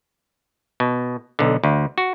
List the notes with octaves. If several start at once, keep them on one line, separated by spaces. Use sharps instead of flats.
B2
B1 D3
D2
F#4